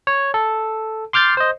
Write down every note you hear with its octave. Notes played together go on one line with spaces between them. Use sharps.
C#5
A4
C6 D6 F6 G6 A6 C7
C5 D#5